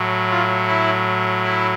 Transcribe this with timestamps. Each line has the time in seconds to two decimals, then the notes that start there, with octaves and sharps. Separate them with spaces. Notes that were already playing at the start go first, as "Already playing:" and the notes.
Already playing: A2 F#3
0.30 F4
0.67 E4
1.44 E4